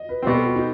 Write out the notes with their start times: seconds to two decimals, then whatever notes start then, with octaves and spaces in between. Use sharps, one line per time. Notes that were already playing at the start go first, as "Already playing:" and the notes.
Already playing: D#5
0.09 B4
0.22 B2 G3 C4 C5
0.34 A4
0.45 F#4
0.56 D#4